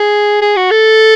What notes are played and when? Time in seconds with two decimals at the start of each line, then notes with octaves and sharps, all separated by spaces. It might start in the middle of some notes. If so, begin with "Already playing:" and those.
Already playing: G#4
0.42 G#4
0.57 F#4
0.71 A4